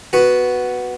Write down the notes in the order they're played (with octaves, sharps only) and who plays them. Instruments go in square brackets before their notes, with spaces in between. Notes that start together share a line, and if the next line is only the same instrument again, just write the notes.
[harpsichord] B3 F#4